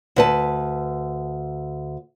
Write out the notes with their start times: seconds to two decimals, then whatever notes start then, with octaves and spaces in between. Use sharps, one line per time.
0.16 D2 B4 A5